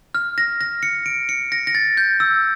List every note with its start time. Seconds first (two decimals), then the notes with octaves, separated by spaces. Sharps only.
0.15 F6
0.38 A#6
0.61 A#6
0.83 C#7
1.06 D7
1.29 C#7
1.52 A#6
1.67 A#6
1.75 A6
1.97 G6
2.20 E6